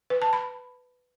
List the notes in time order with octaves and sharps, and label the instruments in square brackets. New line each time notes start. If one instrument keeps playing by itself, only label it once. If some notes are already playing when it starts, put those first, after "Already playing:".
[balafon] B4
A5
B5